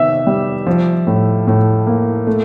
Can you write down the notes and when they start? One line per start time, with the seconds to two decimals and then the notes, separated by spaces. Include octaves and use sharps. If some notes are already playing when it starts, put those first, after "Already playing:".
Already playing: C3 D#3 B3 E5 E6
0.27 G3
0.67 F3
1.07 A2
1.47 A2
1.87 A#3
2.27 A3